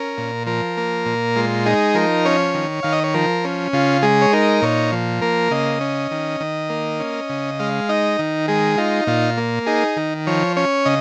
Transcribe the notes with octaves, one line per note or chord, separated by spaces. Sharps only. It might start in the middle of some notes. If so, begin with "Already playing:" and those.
Already playing: C#4 A#4
A#2
F3 A#4
A#3
A#2
G#3 F4
D#4 G#4
F3 A#4
C#4 C#5
D#3
D#3 F5
D#5
C#5
F3 A#4
C#4
C#3 F4
G#3 G#4
C#5
D#4 A#4
A#2 C#5
F3
A#3 A#4
C#3 D#5
C#4
D#3
D#3
A#3
C#4
C#3
G#3 F5
D#4 D#5
D#3
G#3 G#4
D#4 F4
A#2 F4
A#3
D#4 G#4
D#3
F3 C#5
C#4 C#5
C#3 D#5